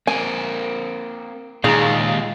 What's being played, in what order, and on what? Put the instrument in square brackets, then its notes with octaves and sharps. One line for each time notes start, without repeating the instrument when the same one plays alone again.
[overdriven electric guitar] A#3 C4 [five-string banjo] G#5
[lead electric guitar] D#2 [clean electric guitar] A#2 D#4 A#5 [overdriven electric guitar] G#3 F4 [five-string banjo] G#4